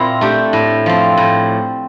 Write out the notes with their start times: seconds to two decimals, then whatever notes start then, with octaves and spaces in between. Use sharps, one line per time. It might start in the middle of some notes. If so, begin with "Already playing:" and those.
Already playing: A#2 C4 E4
0.21 A3 D4 G4
0.53 A2
0.86 F3 C4
1.17 A2